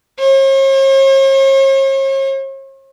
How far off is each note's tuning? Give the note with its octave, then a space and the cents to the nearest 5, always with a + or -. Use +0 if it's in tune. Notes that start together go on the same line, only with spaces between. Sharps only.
C#5 -45